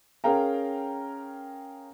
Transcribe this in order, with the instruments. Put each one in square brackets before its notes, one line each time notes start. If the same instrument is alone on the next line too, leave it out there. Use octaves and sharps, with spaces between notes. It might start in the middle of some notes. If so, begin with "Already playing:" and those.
[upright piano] C#4 G#4 A#4 F5 G5 A#5